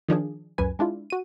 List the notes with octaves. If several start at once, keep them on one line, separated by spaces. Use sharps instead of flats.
D#3 F3 D4 G#4
C#2 F#2 B4 G#5
G#3 D4 E4 F4
F#4 D#7